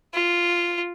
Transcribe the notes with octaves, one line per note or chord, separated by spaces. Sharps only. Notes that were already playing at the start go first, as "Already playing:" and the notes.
F4